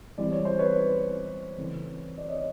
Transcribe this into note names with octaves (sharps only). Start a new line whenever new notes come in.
E3 G3 C4 D5
C#5
C5
B4 C#5
C#3 E3 A3 C4
D5
C#5 D#5